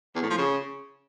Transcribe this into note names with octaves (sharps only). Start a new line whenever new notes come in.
E2
A2
F3
C#3